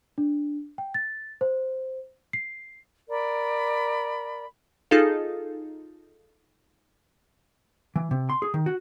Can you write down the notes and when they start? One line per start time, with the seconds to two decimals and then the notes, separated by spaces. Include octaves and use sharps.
0.18 D4
0.78 G5
0.94 A6
1.41 C5
2.33 C7
3.08 A#4 D5 B5
4.91 D#4 F4 G#4 A4 F5
7.96 E3
8.11 C3
8.30 C6
8.42 G#4
8.54 D#3
8.66 F#4